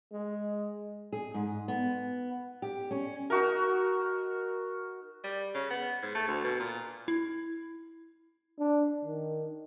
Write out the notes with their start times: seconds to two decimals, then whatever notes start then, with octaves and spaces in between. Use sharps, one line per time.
0.13 G#3
1.13 G#4
1.34 G#2
1.68 B3
2.62 G4
2.91 C#4
3.30 D#4 F#4 A#4
5.24 G3
5.54 C#3
5.70 B3
6.02 G#2
6.15 A3
6.28 D2
6.44 B2
6.60 A#2
7.08 E4
8.59 D4
9.05 D#3